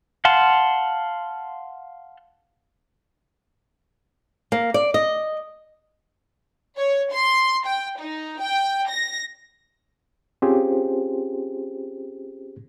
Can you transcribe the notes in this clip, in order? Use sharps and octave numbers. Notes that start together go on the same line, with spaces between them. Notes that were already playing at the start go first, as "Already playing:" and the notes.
F5 F#5 A5 C6
A#3
D5
D#5
C#5
C6
G5
D#4
G5
A#6
C4 C#4 F4 G4 G#4 C5